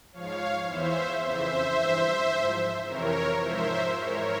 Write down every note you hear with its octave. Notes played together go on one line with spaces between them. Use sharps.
G#2 F3 C#5 F5
E2 E3 C5 E5
F2 C#3 E3 C5 E5
G2 E3
G#2 F3
F2 C3 E3 A#4 C#5
G#2 F3 C5 E5
G#2 E3 A#4 C#5